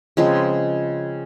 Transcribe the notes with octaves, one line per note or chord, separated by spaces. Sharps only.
C#3 F3 G#3 C4